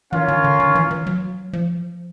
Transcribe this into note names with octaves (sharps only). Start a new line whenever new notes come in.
E3 C#4 F4 A#4 C#5 F5
D#3
D3
D#3
E3
E3
F#3
F3